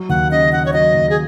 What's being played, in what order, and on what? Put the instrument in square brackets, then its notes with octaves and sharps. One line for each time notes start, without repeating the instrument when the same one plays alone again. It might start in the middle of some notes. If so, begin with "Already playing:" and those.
Already playing: [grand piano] F#3
[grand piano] D#2 [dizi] F#5
[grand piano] C#3 [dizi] D#5
[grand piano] D#4 [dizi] F#5
[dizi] C#5
[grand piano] F#3 [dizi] D#5
[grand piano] D#2
[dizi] G#4